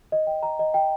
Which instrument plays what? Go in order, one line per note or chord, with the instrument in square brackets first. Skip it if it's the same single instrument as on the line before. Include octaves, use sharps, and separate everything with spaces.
[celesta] D#5
G5
A#5
D#5
G5